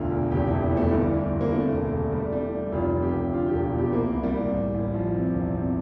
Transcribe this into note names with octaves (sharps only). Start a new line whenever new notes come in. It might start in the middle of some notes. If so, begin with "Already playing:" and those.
Already playing: E1 D2 F4
E1
F1 G4
F1 E4
E2
A3
G1 G3
E3
G1
A#3
C3 A3
E1
E1
G3
G3
E3
F1 F4
C3
G4
F1
D3 F4
G4
E1
F4
E2
G4
C2 A#3
C2
G3
C2
A1
A1
F3
C3
E1
C3